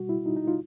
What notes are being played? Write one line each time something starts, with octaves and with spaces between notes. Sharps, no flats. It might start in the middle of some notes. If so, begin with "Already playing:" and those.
Already playing: B2 G3 F#4
E4
D#4
D#4
F4